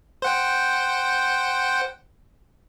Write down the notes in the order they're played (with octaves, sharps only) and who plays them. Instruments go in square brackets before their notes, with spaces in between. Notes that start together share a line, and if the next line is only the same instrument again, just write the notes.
[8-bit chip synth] C5 F#5 G5